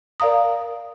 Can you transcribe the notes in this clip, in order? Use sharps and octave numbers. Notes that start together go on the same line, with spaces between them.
A#4 D5 F5 A#5 D#6